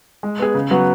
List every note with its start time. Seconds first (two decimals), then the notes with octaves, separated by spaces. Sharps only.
0.23 G#3
0.39 B3 G#4
0.54 C#3
0.71 F#3 B3 F#4